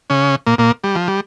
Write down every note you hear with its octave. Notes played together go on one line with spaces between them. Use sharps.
C#3 C#4
A#2 A#3
A#2 A#3
G3
F3
G3